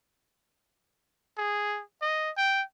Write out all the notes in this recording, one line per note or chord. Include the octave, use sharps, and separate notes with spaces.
G#4
D#5
G5